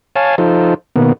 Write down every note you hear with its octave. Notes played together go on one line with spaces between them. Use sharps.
C#5 F5 G#5 A5
F3 D#4 F4 A4 C5
B2 D#3 A#3 B3